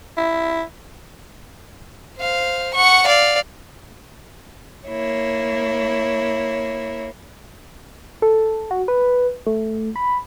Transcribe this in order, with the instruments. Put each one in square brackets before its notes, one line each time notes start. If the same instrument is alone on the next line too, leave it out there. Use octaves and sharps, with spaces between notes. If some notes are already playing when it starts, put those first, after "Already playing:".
[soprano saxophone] E4
[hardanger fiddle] C5 F5
F#5 C#6
D5 F5
[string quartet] A#3 E4 C#5
[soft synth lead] A4
F#4
B4
A3
B5